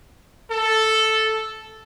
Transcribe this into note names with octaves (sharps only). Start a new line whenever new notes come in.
A4